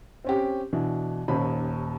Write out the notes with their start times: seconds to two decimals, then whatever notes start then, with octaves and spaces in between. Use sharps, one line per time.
0.25 C4 C#4 G4
0.73 B2 E3 D4
1.28 D#1 D#2 C#4 B5